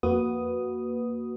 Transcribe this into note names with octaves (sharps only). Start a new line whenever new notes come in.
F2 A#3 F#4 B4 D#6